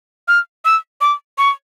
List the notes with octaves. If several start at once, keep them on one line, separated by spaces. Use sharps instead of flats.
F6
E6
D6
C#6